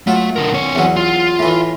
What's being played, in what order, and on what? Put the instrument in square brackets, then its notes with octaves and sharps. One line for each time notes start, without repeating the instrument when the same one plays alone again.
[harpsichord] F#3 F4 [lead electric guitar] A3
[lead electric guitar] D3 A#4
C4 C#5
[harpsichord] E2 F#3
[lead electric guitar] F4
[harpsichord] A2 E3